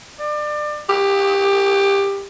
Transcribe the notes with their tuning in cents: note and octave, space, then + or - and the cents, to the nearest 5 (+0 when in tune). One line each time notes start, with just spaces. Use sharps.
D5 +30
G4 +15